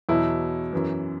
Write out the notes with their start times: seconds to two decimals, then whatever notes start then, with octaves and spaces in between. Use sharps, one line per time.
0.09 E2 B2 F#3 E4
0.73 F#2 E3